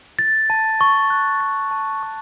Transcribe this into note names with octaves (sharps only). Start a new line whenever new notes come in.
A6
A5
C#6
F#6
A6
A5
C#6